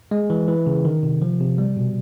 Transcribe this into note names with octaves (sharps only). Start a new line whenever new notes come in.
G#3
E3
E3
C#3
D#3
C3
F3
C3
G3
B2